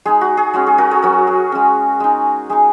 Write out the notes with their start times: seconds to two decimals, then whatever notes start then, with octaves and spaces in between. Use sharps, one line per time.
0.05 G#3 D#4 G#4
0.21 F#4
0.37 G#4
0.54 G#3 C#4 F#4
0.67 G#4
0.78 F#4 A#4
0.91 G#4 C#5
1.03 F#3 C#4 F#4 A#4
1.27 G#4
1.52 G#3 C#4
2.00 G#3 D#4
2.49 G#3 D#4 G#4